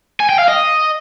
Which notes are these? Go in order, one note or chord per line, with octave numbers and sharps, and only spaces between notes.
G#5
G5
F5
D#5